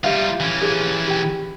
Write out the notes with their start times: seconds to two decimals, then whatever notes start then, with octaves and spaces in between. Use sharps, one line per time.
0.04 G3 F4 G4 E5 F5
0.40 E3 C#4
0.62 G4 G#4
1.08 G4 G5